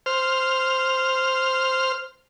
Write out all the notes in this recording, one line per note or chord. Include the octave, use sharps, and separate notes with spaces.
C5 F6